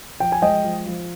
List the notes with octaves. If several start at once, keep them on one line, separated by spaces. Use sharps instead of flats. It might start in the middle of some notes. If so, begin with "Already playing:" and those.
F3 G5
G#5
G#3 D#5 G5
F3
F3